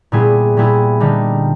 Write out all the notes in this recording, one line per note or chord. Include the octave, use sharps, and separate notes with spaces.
A#2 G3 B3 E4 G#4
A#2 G3 B3 E4 G#4
D3 G3 A#3 D#4